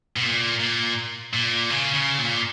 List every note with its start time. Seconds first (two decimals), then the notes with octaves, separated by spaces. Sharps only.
0.16 B2
0.23 A#2
0.60 A#2
1.33 A#2
1.70 C#3
1.94 C#3
2.18 A#2